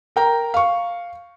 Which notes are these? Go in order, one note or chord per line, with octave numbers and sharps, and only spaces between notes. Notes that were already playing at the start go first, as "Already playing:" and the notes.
A#4 G5 A#5
F5 C#6